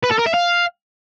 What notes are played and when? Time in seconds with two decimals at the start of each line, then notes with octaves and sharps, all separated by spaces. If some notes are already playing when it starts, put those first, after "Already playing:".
0.03 B4
0.11 A4
0.18 A#4
0.26 E5
0.34 F5